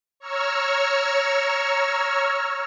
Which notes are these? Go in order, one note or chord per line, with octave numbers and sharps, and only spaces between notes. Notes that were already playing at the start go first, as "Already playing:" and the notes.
C#5 A#5 C#6 E6 F6